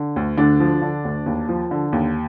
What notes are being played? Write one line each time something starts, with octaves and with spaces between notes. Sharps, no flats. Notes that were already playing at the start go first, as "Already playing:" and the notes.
Already playing: D3
D2
D2 D3 D4
F3
D3
D2
D#2
F3
D3
D#2